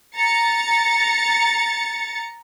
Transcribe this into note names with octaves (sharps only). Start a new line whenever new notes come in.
A#5 A6 C#7